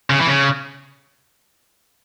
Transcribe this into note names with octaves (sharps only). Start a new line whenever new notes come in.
C#3
E3
C#3